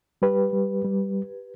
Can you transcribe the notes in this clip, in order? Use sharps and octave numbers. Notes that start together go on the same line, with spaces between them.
G3 G4 B4
G3
G3